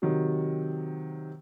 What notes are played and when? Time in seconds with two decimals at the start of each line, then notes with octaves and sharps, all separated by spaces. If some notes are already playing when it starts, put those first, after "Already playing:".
0.02 C3 D#3 F#3